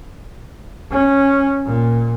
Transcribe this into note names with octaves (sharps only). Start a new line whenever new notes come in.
C#4
A#2